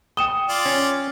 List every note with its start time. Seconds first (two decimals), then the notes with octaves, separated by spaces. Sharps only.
0.17 G5 D#6 E7 G7
0.49 F4 D5
0.66 C#4